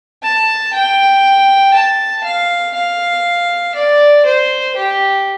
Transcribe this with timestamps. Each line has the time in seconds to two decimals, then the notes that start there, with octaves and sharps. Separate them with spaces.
0.23 A5
0.73 G5
1.74 A5
2.24 F5
2.74 F5
3.75 D5
4.25 C5
4.76 G4